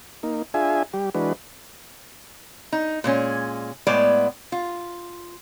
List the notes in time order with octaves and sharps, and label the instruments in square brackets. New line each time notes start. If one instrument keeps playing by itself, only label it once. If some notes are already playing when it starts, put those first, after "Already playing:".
[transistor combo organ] A#3 D#4
D4 F4 G#4 E5 G#5
G3 G4
E3 G#3 D4 F#4 B4
[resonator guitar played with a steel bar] D#4
A#2 G#3 C#4
A2 G#3 B3 D5
F4